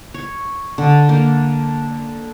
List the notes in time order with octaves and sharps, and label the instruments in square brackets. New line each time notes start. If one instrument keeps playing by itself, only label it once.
[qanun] C#5
D3
A#3